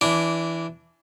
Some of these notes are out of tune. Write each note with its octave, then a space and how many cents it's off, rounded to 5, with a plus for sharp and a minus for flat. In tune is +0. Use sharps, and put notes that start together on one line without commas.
E3 +5 D4 -15